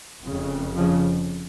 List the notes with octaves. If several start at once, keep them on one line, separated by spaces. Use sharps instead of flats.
F1 F2 C#3
C#3 F3